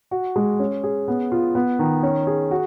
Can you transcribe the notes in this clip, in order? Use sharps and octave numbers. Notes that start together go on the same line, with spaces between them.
F#4
G#3
C#4
G#4
B3
F4
B3
D#3
C#4
G#4
F#4